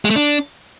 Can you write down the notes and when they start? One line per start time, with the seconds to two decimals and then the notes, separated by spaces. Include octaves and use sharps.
0.05 G#3
0.10 A3
0.16 D4